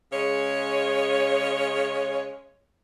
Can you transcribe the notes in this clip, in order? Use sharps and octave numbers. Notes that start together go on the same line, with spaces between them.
C#3 G#3 C#5